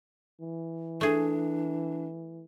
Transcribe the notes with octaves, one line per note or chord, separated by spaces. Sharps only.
E3
A3 D4 G#4